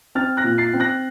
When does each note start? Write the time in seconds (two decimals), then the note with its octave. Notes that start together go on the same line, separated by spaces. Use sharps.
0.15 C4 F6 A6
0.37 F#6 A#6
0.44 A#2
0.58 A6 C7
0.73 C4
0.80 F#6 A#6